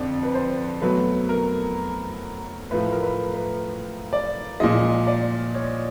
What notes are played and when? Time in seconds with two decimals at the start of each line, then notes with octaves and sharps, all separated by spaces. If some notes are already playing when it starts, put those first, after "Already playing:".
Already playing: F2 D3 D5
0.23 B4
0.34 C5
0.81 B2 F#3 A3 B4
1.29 A#4
2.71 A2 F3 A3 B4
2.92 A#4
3.03 B4
3.34 B4
4.13 D5
4.60 A#2 F3 G#3 D#5
5.07 D5
5.54 C#5